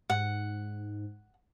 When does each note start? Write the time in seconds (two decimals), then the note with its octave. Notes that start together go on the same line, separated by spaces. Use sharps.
0.10 G#2 F#5